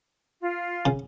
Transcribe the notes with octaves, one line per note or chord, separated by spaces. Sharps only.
F4
C#3